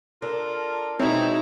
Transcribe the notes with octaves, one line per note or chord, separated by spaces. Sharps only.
D4 F4 A4 A#4
B2 G#3 C4 D#4 E4 C#5 A#5